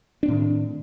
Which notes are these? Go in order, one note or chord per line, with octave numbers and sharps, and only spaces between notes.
A2 D#3 C4 D4